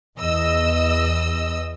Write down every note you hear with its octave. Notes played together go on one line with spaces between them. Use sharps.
E2 D#5 E6